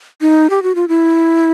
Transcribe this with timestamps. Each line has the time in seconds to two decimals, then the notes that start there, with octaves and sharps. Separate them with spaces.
0.21 D#4
0.50 G4
0.63 F#4
0.75 F4
0.88 E4